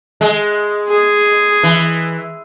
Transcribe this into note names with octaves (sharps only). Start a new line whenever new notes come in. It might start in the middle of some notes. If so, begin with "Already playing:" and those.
G#3
G#4
E3